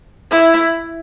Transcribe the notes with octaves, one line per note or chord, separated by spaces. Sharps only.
E4